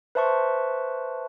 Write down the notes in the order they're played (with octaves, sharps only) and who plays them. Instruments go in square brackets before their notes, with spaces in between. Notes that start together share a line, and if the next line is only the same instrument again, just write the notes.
[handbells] B4 C5 E5 A5 C6 C#6